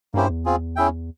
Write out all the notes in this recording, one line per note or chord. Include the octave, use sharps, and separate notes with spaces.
G2 A#3 C#4 E4 G4 C5
E2
C4 F4 G#4
C#4 E4 G#4 E5 G5